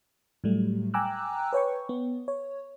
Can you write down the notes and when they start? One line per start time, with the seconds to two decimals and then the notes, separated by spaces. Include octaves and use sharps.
0.44 A2 F#3 G3 A3
0.94 G5 G#5 A#5 D6 E6 F#6
1.53 B4 C#5 G5 C#6
1.89 B3
2.28 C#5